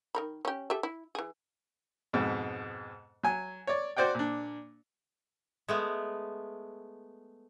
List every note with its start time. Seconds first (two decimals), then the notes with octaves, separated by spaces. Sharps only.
0.15 D#3 A#4 B5
0.45 C#4 G4
0.70 G4 A4 E5
0.83 E4
1.15 E3 G#4
2.13 F2 G#2 B2
3.23 F#3 G#5
3.67 C#5 D5
3.97 F#4 C5 D5 F#5 G5
4.15 A#2 D4
5.68 G#3 A3 B3